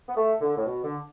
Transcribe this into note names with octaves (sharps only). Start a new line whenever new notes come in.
B3
A3
D3
A2
B2
D3